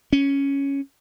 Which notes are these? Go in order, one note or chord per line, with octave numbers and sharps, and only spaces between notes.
C#4